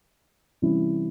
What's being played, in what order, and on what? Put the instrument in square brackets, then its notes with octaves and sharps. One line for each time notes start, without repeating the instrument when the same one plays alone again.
[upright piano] C3 E3 G3 C#4 E4